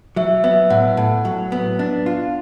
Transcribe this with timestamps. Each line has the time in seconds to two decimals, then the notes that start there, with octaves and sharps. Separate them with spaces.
0.16 F#3 E5
0.44 B3 E5
0.70 A2 F#5
0.97 A2
1.25 F#3
1.52 B3
1.79 D4
2.06 F4